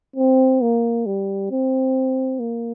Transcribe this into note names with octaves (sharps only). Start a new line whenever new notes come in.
C4
A#3
G3
C4
A#3